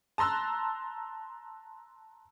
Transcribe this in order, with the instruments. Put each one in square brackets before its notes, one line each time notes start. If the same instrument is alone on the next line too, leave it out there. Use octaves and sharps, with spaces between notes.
[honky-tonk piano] A5 A#5 C6 E6 F#6